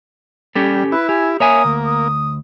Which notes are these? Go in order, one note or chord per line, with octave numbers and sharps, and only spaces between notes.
G3 C#4 G4 A4
E4 B4
G4 G#5
A#3 C#5 E5 G#5 D#6
D2
D#6